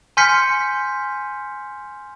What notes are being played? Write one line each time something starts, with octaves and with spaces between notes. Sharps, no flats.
G#5 C6 F6 G6 B6 C#7